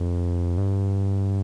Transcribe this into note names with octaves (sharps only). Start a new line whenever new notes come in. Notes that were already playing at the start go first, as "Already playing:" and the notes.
Already playing: F2
G2